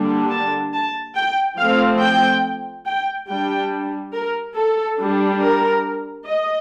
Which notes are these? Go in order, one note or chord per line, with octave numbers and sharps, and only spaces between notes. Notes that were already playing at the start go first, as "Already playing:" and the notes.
Already playing: D3 G3 A#3 D4
A5
A5
G5
F3 A3 C4 F5
G5
G5
G3 D4 G5
A#4
A4
G3 D4
A#4
D#5